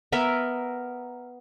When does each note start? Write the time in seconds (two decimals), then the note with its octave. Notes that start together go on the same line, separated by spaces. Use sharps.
0.12 B3 A#4 E5